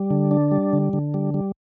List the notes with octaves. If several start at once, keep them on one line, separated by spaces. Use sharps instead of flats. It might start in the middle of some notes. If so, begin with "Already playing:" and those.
Already playing: G3
D3
D4
G3
D3
D3
G3
G3